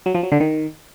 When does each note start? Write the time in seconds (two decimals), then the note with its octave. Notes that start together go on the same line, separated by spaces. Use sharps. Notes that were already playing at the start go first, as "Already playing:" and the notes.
0.06 F#3
0.15 F3
0.23 F#3
0.32 D3
0.40 D#3